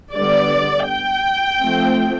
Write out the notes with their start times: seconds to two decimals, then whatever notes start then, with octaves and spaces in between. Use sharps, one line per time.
0.14 D3 G3 B3 D5
0.88 G5
1.62 F3 A3 C4